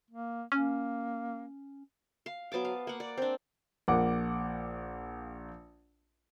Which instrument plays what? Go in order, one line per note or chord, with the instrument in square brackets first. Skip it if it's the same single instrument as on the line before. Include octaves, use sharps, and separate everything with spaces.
[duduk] A#3
[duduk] A#3 [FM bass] C#4
[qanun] F5
F#3 B3 A5 D6
F5
A#3 F#5
D5
C4 D4
[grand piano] A#1 A#3 F#5 D6